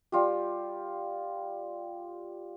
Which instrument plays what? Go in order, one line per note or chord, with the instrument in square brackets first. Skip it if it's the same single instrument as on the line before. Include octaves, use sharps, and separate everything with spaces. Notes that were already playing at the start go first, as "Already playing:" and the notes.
[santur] G3 F4 G4